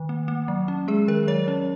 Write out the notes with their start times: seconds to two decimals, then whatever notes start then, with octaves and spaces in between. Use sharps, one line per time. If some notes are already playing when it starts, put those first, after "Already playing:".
Already playing: D#3
0.09 A#3
0.28 A#3
0.48 F#3
0.68 C#4
0.88 G#3 G#4
1.08 D#3 A#4
1.28 F#3 C#5
1.48 C#4